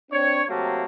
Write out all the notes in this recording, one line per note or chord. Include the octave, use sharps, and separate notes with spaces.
C4 D4 C#5
C3 F#3 A3 A#3